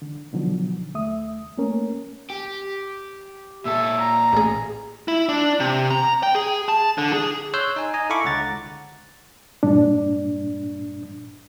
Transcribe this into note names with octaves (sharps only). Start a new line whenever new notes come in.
D3
B2 D3 D#3 F3 F#3
D#2 A3 E5 D#6
A3 A#3 C#4 A#4
G4
A#2 A4 E5
A#5
A1 G#4
E4
D4
C3
A#5
G5
G#4
A5
D3
G#4
C#5 C6 E6 F#6 G6
D#4 G#5
D#5 G#5 A#5
E4 A4 F5 B5 C#6 D6
C#2 D3 F#5 A#5 A6
G2 A#2 D4